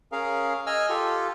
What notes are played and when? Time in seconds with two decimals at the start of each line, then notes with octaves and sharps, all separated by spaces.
0.12 C#4 G#4 A#4 F5
0.66 D#5 G#5 E6 F6
0.89 F4 G4 A4